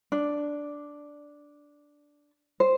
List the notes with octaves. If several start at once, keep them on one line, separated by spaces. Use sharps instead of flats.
D4
C5